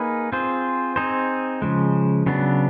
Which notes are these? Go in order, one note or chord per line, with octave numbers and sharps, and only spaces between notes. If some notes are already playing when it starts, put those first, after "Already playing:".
Already playing: A#3 D#4 G#4 B4
C4 F4 G#4 C5
C4 D#4 G#4 C5
C#3 F3 G#3
C#3 F#3 B3 D4